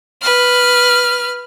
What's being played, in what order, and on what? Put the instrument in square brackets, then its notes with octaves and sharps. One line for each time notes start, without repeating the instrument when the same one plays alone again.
[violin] B4 F6